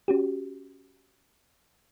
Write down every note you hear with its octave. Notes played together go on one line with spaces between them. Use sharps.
C#4 F#4 G4